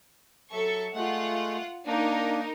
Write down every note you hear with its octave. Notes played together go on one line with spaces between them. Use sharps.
F#3 A4 E5 C#6
G#3 A3 F4 F#5
A#3 D4 D#4 A#4